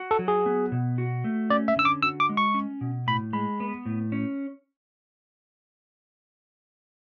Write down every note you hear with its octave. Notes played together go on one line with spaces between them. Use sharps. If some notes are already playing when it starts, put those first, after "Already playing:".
Already playing: F#4
A4
F#3
G#4
B3
B2
F#4
A3
C#4 D5
E5
D3 E6
D6
F#4 E6
D6
G#3
C#6
C#4
B2
A2 B5
G#3 B5
B3
A2
C#4